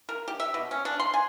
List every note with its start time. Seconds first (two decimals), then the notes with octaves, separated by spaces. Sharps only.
0.09 A#4
0.28 G4
0.40 E5
0.54 B2
0.71 C#4
0.85 D4
1.00 C6
1.14 G#5